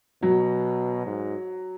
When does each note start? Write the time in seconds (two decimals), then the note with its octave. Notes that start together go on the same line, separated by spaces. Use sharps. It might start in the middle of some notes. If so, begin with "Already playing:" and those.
0.22 B2 F#3
1.06 G#2